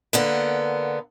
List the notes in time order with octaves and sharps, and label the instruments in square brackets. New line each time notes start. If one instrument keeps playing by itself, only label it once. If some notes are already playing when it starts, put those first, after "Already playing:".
[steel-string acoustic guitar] D3 A#3 B3